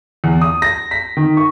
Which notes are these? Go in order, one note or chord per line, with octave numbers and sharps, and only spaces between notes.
E2
D#6
A#6
B6
D#3
C#6